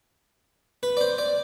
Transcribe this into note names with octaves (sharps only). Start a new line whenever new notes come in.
B4
D5
C5
D5